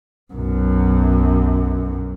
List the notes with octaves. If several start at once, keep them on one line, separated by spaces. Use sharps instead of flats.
B1 F#2